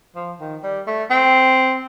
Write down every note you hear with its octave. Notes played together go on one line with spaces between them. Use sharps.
F3
D#3
G3
A3
C4